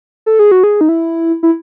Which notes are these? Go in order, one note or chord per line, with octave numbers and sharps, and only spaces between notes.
A4
G#4
F#4
G#4
D#4
E4
E4